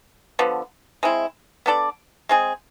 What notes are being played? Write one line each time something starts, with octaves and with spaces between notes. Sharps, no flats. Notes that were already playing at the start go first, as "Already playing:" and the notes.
D3 F3 B3
G#3 C4 E4
B3 D4 A4 D5
G#3 C4 G#4